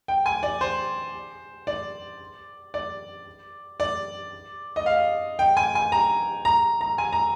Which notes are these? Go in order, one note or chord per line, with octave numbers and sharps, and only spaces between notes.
G5
G#5
D5
C5
D5
D5
D5
D#5
F5
G5
G#5
G#5
A#5
A#5
A#5
G#5
A#5